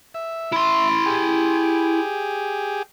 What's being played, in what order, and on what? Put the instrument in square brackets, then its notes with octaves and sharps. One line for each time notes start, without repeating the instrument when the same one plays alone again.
[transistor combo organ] E5
[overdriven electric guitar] E4 C6
[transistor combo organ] G4 G#4